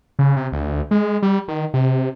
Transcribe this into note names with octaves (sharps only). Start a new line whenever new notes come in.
C#3
C3
D2
G#3
G3
D#3
C3